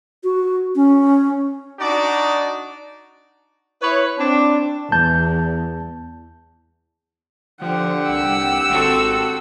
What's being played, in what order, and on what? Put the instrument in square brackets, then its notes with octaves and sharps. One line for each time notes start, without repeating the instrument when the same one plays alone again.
[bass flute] F#4
C#4
[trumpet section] D4 D#4 F#4 D5
[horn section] E4 B4 C#5
C4 D4
[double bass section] E2 [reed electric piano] A5 G6
[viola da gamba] D3 [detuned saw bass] F3 [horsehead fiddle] G4 F#5
[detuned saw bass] C2 [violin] E6
[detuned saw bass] G#1 [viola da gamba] C4 F#4 A4